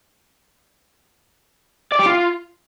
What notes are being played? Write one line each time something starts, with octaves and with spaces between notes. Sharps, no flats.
D5
G4
F4